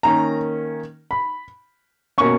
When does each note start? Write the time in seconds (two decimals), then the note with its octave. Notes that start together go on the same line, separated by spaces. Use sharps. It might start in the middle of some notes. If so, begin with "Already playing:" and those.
0.03 D#3 A#3 C#4 A#5
1.11 B5
2.18 B2 A#3 C#4 C#6